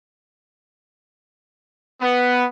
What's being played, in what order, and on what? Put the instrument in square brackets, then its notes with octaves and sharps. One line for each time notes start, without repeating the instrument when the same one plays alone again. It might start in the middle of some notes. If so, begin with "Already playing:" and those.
[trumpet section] B3